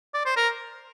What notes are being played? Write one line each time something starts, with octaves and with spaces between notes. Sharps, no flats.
D5
C5
A#4